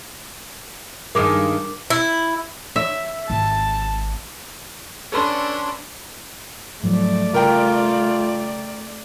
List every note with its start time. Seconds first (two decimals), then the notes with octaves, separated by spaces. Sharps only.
1.15 G2 D#3 G#3 A#4 D6
1.90 E4
2.76 E5
3.30 G#1 A5
5.12 C#4 D4 A4 B4 C6
6.83 G#2 F3 F#3 A3 D5
7.34 C#3 G3 F4 A#4 G5